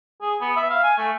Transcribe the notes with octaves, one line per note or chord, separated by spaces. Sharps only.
G#4
B3
E5
F5
G#5
A3